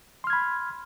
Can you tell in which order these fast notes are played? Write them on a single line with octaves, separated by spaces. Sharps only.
C6 F6 G#6 B5